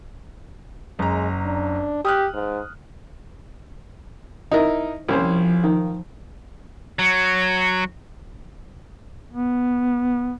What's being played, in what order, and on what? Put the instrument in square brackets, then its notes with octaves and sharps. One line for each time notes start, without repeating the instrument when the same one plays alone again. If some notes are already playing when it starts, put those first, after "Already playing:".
[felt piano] F#1 A#5 [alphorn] G#3
[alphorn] D4
[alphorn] G4 [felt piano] D#6 F6 F#6
[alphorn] G#2
[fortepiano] D#4 E4 A#4
[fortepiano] C2 C#4 C5 [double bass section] F3
[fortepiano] D#3
[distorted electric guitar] F#3
[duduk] B3